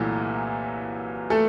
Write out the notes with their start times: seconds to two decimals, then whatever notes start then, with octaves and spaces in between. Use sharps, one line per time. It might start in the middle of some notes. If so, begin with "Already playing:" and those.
Already playing: C2 A#2 E3 F#3 A3 E4
1.30 A3 A4